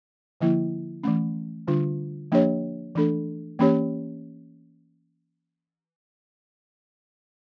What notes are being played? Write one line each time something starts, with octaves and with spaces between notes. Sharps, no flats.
D3 F3 A#3 E4
E3 A3 C#4
D3 G3 D4 F4
F3 A#3 D4 G4 C#5
E3 A3 D4 A4
E3 A#3 C#4 G4 C#5